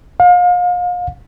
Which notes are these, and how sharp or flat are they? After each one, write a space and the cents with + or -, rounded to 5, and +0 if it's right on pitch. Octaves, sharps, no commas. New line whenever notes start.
F5 +35